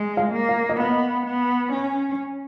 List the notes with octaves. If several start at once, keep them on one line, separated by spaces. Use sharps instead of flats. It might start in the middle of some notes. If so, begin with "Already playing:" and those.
Already playing: G#3
F5
A#3
F5
D#5
B3 F5
B3
C#4